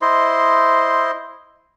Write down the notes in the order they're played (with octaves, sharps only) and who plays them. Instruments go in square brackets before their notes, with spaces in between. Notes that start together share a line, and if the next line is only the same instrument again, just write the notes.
[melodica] E4 C5 D#5 C6